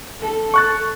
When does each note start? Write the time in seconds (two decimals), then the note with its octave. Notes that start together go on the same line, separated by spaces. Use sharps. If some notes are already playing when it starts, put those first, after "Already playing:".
0.20 A4
0.54 C#6 F#6 A6